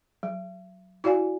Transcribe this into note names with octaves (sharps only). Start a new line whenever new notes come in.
F#3
E4 F#4 D5 F5 G#5